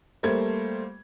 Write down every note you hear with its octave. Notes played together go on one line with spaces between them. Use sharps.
G3 A3 A#3 C5 G#6